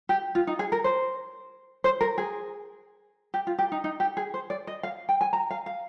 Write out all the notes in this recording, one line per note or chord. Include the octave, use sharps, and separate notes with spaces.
G4
F4
D#4
G#4
A#4
C5
C5
A#4
G#4
G4
F4
G4
D#4
D#4
G4
G#4
C5
D5
D#5
F5
G5
G#5
A#5
F5
F5